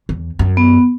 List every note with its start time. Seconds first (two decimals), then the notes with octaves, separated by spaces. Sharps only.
0.09 E2
0.39 F#2
0.57 B3